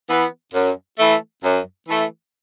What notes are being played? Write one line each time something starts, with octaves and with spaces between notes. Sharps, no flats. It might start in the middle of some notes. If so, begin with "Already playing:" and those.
E3 B3
F#2
E3 A3
F#2
E3 A3